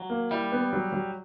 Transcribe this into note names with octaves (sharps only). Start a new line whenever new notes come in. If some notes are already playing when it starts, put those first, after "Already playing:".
Already playing: F#3
A#3
G3 E4
B3
F#3
F#3